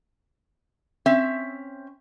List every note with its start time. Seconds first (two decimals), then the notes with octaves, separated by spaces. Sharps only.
1.06 C4 C#4 E5